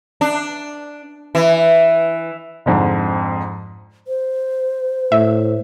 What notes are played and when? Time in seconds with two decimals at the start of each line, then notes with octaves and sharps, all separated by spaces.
0.21 D4
1.35 E3
2.66 F2 G#2 D3
4.07 C5
5.12 A2 E5